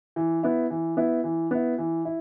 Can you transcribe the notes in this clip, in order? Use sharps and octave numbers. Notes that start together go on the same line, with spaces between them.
E3
B3 E4
E3
B3 E4
E3
B3 E4
E3
E4